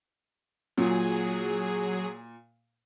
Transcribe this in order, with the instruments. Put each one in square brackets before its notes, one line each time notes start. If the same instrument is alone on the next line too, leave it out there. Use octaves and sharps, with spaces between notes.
[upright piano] A#2 [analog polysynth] F#3 G#4